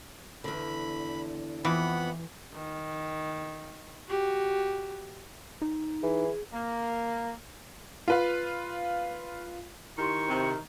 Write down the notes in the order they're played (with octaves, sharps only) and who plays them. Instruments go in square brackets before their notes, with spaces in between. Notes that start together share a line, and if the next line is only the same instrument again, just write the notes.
[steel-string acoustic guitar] E2 D3 [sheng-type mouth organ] B5
[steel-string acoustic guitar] F2 [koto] E3 [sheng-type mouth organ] B3 F#5 B5
[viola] D#3
F#4 G4
[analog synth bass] D#4
[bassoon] E3 [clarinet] G#4
[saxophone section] A#3
[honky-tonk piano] F4 B4 F5
[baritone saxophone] D#3 [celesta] E4 G4 C6 [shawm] C#6
[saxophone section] C3